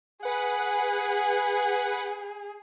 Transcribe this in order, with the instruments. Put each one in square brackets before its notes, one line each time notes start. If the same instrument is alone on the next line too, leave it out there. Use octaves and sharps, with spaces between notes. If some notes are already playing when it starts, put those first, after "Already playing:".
[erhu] G#4 [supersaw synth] B4 F#5